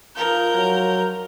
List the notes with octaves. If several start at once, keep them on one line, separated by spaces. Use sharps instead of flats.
F3 D#4 A#4 G6
F#3